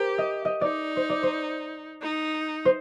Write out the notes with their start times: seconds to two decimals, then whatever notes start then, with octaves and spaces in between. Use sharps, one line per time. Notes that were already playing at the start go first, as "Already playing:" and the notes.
Already playing: G4 A#4 C5
0.18 D#5
0.45 D#5
0.61 D#4 D5
0.97 C5
1.10 D5
1.23 C5
2.02 D#4
2.65 C5